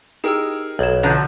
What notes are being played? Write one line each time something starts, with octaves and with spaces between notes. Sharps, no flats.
D#4 G4 G#4 A#4 G5 E6
B1 A4 G#6 E7
D3 F3 F#3 A#5 F#6 G6